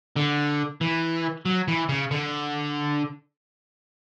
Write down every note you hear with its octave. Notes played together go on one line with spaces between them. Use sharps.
D3
E3
F#3
E3
C#3
D3